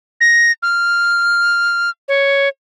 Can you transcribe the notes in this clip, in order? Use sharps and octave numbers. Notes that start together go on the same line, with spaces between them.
A#6
F6
C#5